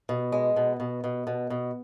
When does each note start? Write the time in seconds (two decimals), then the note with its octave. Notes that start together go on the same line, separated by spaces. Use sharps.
0.09 B2
0.32 G#3
0.56 B2
0.80 B2
1.04 B2
1.27 B2
1.50 B2